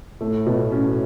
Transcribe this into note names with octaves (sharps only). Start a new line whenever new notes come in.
A2 A3
B2
C#4